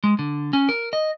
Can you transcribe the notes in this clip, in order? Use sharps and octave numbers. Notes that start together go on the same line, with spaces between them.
G#3
D3
C#4
A#4
D#5